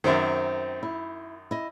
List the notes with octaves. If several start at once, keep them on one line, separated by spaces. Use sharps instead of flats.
F#2 D#3 C4 C5 E5
E4
E4 D#5